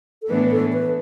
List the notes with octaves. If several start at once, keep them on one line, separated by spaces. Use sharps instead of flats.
A4
A2 E3 B3 D4 B4
A4
B4